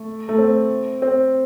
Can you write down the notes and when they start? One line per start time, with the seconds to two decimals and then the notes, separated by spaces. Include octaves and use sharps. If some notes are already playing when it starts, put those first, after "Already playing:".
Already playing: A3
0.29 A3
0.38 C4
1.02 C4